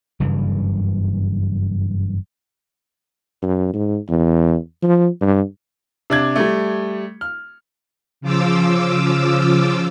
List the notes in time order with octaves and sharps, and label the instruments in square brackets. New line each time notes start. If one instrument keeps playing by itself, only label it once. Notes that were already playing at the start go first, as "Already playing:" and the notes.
[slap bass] F#1 G2 C#3 E3
[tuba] F#2
G#2
E2
F3
G2
[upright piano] C3 D4 G#6
G3 A3
F6
[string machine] C#3 F3 F4 D6 E6